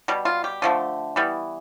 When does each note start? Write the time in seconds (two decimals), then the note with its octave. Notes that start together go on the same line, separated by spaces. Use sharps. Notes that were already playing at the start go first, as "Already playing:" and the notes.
0.08 B2 G3
0.25 F4
0.44 G4
0.62 D3 F3 A3
1.16 E3 G3 B3